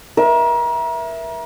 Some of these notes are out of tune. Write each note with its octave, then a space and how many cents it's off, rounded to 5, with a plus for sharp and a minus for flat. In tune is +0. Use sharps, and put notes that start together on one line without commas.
A#4 +35 E5 +0